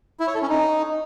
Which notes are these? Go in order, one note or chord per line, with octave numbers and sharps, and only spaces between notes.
E4
C#5
A4
C#4
D#4